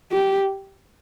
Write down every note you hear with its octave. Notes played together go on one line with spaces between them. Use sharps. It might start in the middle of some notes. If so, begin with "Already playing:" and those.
G4